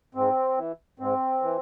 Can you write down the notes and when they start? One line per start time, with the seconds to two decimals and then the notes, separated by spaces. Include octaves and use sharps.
0.15 G#2 C4
0.57 E3
0.99 G#2 C4
1.42 E3